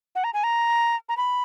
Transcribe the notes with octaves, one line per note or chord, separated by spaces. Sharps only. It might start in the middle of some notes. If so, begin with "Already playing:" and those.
F#5
A#5
G#5
A#5
A#5
B5